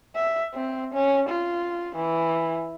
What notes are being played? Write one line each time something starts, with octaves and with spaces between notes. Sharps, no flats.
E5
C4
C#4
F4
E3